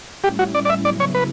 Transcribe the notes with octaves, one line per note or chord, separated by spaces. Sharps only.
A2 G3 C#4 E4 G4
F#4
D5
D5
E5
C#3 F#3 B3 E4 D5
C#5
B4